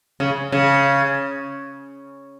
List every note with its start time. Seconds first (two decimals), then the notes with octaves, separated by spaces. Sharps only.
0.20 C#3
0.52 C#3